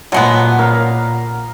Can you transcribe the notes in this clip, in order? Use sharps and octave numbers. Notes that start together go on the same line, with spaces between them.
A#2 D3 F#3 G#3 B3
A#4 F5